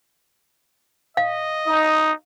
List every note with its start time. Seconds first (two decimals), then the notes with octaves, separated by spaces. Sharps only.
1.17 D#5 F5
1.67 D#4 D#6